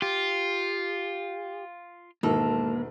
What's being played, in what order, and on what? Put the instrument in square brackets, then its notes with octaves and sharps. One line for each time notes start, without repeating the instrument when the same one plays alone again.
[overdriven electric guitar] F4 [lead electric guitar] G4
[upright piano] E1 G#2 D#3 [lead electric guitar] A#3 [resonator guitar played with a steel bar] A4